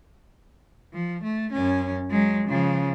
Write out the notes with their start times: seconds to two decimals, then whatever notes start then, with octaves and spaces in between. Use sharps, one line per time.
0.93 F3
1.23 A3
1.52 F#2 C#4
2.10 F#3 G#3
2.47 C#3 F3